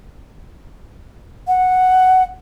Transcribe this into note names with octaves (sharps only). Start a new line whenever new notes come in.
F#5